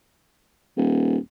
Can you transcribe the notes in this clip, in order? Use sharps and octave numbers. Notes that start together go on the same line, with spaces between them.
D#1